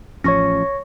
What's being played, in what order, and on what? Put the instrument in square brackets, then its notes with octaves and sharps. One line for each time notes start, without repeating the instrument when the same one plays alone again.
[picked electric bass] A1 F3 C#4 [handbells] C#5 C#6 A#6